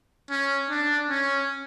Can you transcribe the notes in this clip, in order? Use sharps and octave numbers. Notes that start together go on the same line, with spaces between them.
C#4
D4
C#4